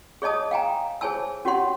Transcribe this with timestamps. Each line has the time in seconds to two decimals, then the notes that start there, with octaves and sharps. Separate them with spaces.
0.22 G#4 C#5 D#5 A5 D#6
0.51 F5 G5 G#5 A#5
1.01 G#4 C5 C#5 G#5 A5 E6
1.45 C#4 F#4 G4 C#5 F#5 C6